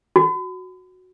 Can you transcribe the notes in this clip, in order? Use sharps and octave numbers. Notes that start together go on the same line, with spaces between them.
F#4